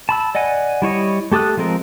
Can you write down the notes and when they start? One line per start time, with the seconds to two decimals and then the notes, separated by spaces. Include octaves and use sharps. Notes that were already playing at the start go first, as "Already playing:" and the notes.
0.09 A5 B5 E6
0.35 D5 D#5 F#5 G#5
0.82 G3 E4 C#5 D#5
1.31 A3 G4 A4 D#6 F#6
1.57 F3 G#3 C4 A#4